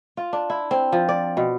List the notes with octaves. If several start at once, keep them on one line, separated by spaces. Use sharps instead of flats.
F4
D4
E4
C4
F3
D5
B2